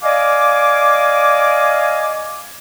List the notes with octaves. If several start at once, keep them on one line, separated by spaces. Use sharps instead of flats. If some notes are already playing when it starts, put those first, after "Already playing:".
D5 D#5 F5 G#5 D6